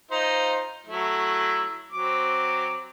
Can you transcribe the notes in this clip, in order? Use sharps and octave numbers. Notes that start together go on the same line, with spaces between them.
D#4 F4 C5
F#3 A3 E4
F#3 C4 D6